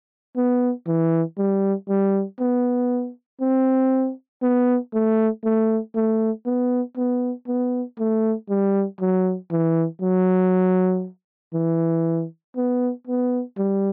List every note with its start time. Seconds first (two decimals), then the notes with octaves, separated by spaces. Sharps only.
0.37 B3
0.87 E3
1.38 G3
1.89 G3
2.40 B3
3.41 C4
4.42 B3
4.93 A3
5.44 A3
5.96 A3
6.46 B3
6.97 B3
7.47 B3
7.99 A3
8.49 G3
9.01 F#3
9.51 E3
10.01 F#3
11.54 E3
12.57 B3
13.07 B3
13.58 G3